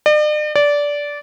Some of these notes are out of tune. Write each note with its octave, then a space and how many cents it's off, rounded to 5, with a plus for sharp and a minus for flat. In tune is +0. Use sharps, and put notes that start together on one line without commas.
D5 +45
D5 -15